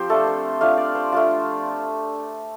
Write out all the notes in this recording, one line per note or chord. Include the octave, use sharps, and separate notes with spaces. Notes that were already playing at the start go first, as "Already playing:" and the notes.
Already playing: F3 C4 G4 C5
A3 D4 F4 A4
C5
A3 D4 F4 F5
D5
C5
A3 D4 F4